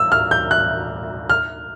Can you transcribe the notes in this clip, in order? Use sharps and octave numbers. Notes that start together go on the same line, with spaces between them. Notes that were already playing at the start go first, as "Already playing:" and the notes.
Already playing: E6
F6
G6
F#6
F6